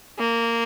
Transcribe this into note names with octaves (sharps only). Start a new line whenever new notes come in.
A#3